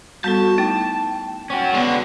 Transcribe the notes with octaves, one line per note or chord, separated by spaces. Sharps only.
G3 B3 F#4 A4 A5
A3 D#4 E4 G5
C#4 F#4 G5
D3 G#3 B3 F#4